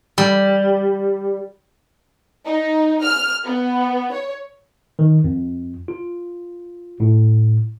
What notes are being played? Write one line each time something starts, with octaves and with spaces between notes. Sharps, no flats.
G3
D#4
F6
B3
C#5
D#3
F2
F4
A2